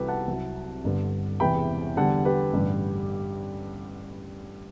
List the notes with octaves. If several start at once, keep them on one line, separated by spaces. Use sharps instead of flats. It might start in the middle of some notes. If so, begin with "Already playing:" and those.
Already playing: C2 C3 E3 G3 F#4 G4 A4 B4
F#5 A5
C2 C3 F#3
G1 G2 D3
E1 E2 C3 E3 G5 B5
E2 D3 G3 F#5 A5
G4 B4
A1 G2 D3 G3